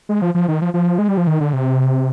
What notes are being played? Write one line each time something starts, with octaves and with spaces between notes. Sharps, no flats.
G#3
F3
F3
D#3
F3
F3
G#3
G3
F3
D#3
D3
C3